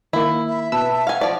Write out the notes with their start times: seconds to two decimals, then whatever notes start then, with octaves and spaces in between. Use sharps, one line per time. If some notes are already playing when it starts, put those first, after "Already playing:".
0.13 D#3 A#3 E4 B5
0.47 E5
0.72 B2 B4 A5 E6
1.07 F5 F#5 G#5
1.21 F3 D5